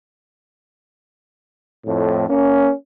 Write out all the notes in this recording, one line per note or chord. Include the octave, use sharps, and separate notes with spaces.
F2 A2
A#3 C#4